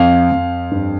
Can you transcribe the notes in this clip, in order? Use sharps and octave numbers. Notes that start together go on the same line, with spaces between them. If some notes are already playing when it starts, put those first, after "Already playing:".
Already playing: F2 F5
F2
G2